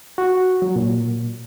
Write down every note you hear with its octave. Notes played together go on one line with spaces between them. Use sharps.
F#4
F#3
A#2